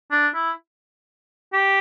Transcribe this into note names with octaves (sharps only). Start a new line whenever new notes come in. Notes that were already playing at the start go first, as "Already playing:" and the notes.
D4
E4
G4